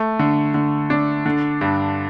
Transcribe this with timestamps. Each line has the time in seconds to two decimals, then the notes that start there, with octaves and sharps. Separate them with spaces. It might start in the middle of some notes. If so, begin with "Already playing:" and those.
Already playing: A3
0.19 D3
0.54 D3
0.90 D4
1.26 D3
1.61 G2